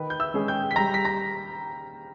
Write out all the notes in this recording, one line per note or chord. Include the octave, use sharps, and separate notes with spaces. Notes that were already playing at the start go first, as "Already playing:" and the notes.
Already playing: D#3 B4 B5
G6
E5 E6
G#3 C#4 G#4
G5 G6
B6
G3 A#5 A#6
B6
A#5 A#6